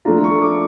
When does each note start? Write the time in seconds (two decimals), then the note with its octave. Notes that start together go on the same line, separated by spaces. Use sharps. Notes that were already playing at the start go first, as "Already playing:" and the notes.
0.05 F3 A3 D4 F4 A#5
0.24 C#6
0.42 D6